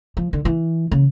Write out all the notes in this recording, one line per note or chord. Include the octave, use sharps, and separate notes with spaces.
F3
D3
E3
C#3